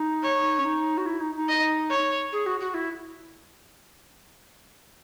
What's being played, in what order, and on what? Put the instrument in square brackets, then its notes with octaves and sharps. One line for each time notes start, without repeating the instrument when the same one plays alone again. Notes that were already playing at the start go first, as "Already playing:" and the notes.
Already playing: [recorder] D#4
[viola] C#5
[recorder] C#4
D#4
F#4
E4
D#4
D#4
[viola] D#5
C#5
[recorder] G#4
F#4
F#4
E4